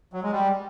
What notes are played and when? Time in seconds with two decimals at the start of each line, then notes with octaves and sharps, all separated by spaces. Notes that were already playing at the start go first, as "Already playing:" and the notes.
0.13 F#3
0.23 G#3
0.32 G3